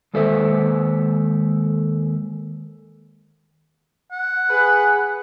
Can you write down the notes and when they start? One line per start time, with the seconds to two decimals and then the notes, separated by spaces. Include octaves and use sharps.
0.14 D#2 G#3 A4 C5 E5
4.11 F#5
4.50 G#4 B4